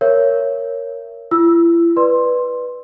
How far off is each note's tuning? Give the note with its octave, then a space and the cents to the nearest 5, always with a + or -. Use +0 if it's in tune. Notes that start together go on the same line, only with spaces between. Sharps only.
A#4 +0 C#5 +0 E5 +35
E4 +40 E6 +0
B4 +0 D5 +15 C6 +10